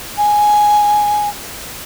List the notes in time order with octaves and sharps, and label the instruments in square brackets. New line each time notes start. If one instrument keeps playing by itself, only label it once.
[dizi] G#5